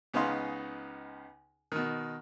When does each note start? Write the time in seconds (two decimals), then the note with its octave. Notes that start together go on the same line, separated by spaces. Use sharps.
0.14 C#2 C#3 B3 D#4 F5 C6
1.72 B2 D#3